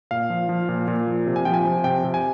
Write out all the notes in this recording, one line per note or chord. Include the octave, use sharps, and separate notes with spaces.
A#2 F5
F3
F3
A#2
A#2
F3
C3
G#5
F3 G5
G#5
F3
C3 G5
C3
G#5